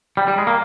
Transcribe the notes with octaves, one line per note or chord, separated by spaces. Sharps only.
G3
G3
G#3
A#3